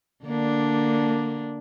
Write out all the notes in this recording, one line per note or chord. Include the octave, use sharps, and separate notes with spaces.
D3 A#3 D4